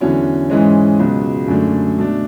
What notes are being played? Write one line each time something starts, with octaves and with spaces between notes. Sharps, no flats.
E2 D3 F#3 C#4 E4
G#2 E3 G#3 C#4
C#2 B2 F#3
F#2 D3 A3
B2 A3 D4